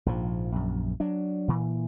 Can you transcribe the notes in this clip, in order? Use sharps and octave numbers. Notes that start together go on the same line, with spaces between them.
A#1 G#2 F3
A#1 F#2
F#3 D4
A#2 E3